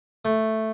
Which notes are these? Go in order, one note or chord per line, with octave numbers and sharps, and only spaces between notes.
A3